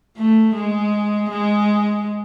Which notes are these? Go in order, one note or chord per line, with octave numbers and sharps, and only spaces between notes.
A3
G#3
G#3